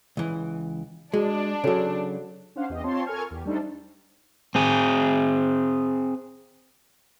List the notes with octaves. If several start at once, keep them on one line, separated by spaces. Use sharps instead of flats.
C#2 E3
G#3 D4 F#4 G#4
C#3 F#3 F#4 A4 C#5
C#4 D4 C5 F5 F#5
E2 G4 D#5
C4 F4 C#5 A5 C6
A4 A#4 G#5 C#6 F6 G#6
E2 G4
G3 A3 D4 D#4 A4 C5
C4 G#4